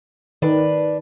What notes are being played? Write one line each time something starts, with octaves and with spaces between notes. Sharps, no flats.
D#3 D4 B4